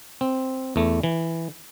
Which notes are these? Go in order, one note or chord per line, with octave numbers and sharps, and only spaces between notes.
C4
E2 A3
E3